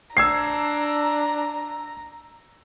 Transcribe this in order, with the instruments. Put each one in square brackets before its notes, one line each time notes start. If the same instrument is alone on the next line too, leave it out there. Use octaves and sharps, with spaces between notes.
[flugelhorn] D4 [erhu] A#5 [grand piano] E6 G#6 C7